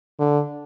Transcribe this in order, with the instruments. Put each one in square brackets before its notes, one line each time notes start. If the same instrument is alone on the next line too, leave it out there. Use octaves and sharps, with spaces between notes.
[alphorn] D3